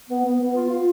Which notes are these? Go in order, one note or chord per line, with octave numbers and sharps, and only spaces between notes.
B3
B3
B3
F4
F4